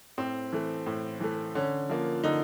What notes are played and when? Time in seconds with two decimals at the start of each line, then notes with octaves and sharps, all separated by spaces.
0.18 A2 C4
0.53 E3 A3
0.86 A2
1.20 E3 A3
1.55 D3 C#4
1.89 F3 A#3
2.24 D3 D#4